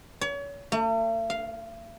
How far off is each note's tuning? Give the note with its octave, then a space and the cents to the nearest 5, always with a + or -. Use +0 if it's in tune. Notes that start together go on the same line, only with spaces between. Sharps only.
C#5 +35
A3 +45
F5 +0